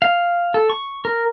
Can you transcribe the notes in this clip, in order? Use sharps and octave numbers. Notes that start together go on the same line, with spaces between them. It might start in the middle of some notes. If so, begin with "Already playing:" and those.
F5
A4
C#6
A#4